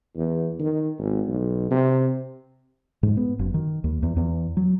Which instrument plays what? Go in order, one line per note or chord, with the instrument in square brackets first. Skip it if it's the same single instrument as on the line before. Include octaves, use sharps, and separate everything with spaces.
[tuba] E2
D#3
G#1
B1
C3
[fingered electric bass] G#2
B3
F#1
D#3
D#2
E2
E2
F#3